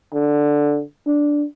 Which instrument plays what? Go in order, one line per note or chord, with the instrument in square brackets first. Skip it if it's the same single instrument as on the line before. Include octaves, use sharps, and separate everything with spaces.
[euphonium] D3
D4